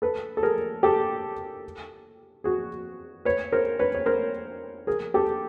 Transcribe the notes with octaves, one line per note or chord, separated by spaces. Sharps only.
A4 B4
A4
G#4 A#4
G4 A4
F#4 G#4
B4 C#5
A#4 C5
B4 C#5
C#5
A#4 C5
G#4 A#4
G4 A4